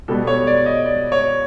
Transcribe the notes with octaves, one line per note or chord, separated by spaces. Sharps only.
B2 G3 B3 A4
C#5
D5
D#5
D5
C#5